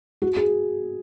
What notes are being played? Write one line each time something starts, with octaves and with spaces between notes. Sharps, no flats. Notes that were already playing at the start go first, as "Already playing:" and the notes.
F#4
G#4